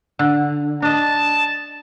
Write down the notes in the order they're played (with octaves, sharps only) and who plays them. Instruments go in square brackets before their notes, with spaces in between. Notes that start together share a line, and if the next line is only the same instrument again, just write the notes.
[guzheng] D3
[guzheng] D4 D#5 [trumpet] A5